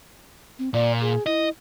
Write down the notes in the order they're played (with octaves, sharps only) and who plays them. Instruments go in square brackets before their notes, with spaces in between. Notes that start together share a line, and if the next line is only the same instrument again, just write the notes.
[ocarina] C4
[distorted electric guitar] A#2 [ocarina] D5
[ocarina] G#4
[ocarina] E4 [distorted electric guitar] D#5